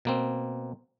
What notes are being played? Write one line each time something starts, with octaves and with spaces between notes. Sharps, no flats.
B2 A#3 C4